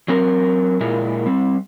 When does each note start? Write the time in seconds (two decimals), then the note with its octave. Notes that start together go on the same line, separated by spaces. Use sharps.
0.08 F#3 C4 A#4
0.80 A#2 G#3 E4 A#4
1.26 G3 C4